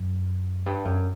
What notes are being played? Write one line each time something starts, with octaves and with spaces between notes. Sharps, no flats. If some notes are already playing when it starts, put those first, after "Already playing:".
Already playing: F#2
G2
F#2